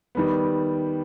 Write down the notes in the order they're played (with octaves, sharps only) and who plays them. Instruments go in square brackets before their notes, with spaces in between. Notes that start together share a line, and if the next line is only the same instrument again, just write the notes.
[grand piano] D#3 G3 B3